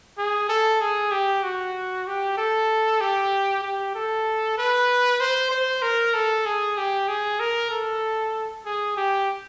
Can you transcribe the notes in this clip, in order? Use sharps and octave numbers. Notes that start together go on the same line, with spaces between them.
G#4
A4
G#4
G4
F#4
G4
A4
G4
G4
A4
B4
C5
C5
A#4
A4
G#4
G4
G#4
A#4
A4
G#4
G4